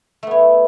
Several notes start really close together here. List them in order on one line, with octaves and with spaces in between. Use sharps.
A3 B3 C#5